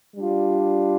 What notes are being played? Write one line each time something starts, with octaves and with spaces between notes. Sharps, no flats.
G3 D4 F4